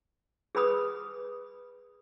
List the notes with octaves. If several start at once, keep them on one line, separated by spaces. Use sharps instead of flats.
G#4 B4 B5 D#6